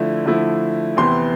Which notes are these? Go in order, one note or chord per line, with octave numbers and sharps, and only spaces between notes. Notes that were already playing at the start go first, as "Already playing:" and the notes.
Already playing: D3 F3 A3 E4
D3 F3 A3 E4
E2 C3 E3 B3 E4 C6